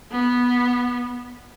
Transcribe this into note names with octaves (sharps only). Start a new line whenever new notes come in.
B3